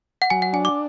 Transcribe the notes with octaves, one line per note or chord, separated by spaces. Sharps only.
F#5
F#3 G#5
F#5
D4 G#5
D6